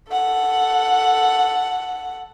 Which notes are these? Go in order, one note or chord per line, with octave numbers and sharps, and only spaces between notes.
A4 F#5